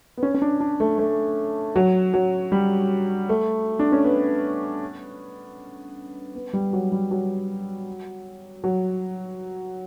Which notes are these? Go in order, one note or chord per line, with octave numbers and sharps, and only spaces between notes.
B3
C#4
C#4
D4
D4
A3
A3
F#3
F#3
G3
A3
D4
C#4
B3
B3
G3
F#3
G3
F#3
F#3